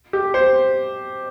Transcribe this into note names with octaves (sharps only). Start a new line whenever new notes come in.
G4
C5